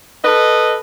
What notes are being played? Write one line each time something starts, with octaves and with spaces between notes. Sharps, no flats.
A4 B4 D#5